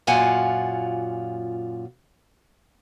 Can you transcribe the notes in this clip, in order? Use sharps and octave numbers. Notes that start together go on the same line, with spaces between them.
F#2 A#2 F4 F5 F#5 G#5